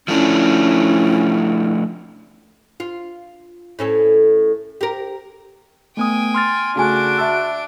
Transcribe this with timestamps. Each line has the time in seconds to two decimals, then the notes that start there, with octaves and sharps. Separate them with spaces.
0.08 F3 A3 C#4 D4 E4
2.80 F4
3.79 A2 C#4 A4
4.81 G4 A#4
5.97 A3 B3 G5 G#5 D#6
6.35 C6 F6 A6
6.76 C#3 A3 D4 F#4 G#5 D7
7.18 E5 A5 E6